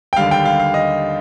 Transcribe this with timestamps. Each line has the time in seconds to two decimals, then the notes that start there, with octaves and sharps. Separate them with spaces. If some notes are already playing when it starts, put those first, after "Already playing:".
0.13 G5
0.16 D#2 D3 G3 F5
0.31 G5
0.45 F5
0.60 F5
0.74 D#5